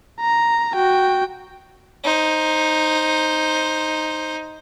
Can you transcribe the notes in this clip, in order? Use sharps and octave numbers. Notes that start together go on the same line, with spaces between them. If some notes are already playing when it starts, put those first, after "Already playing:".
A#5
F#4 G5
D#4 C5